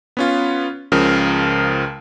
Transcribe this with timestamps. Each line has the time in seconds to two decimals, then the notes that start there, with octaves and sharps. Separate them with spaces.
0.17 B3 C#4 F4
0.92 C#2 C#3 F3 A#4